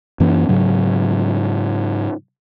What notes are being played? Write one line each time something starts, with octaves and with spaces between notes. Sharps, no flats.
F#2 E3 A#3 C#4
G#2 C#3 F#3